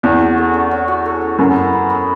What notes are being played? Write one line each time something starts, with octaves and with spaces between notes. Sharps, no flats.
E2 C#4
F#4
A4
C#4
C#4
F#4
A4
C#4
F#2 B3
E4
B4
B3